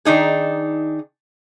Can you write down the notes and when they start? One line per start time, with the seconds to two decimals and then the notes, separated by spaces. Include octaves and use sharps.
0.05 D#3 D4 D#4 G#4